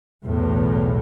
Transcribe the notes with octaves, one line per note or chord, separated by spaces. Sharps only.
B1 E2 A2